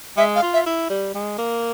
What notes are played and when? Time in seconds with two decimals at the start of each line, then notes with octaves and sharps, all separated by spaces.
0.17 G#3 E5
0.35 F5
0.42 F4
0.53 E5
0.66 E4
0.90 G3
1.14 G#3
1.38 A#3